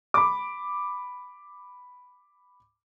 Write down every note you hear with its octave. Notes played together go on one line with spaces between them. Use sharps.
B5 D6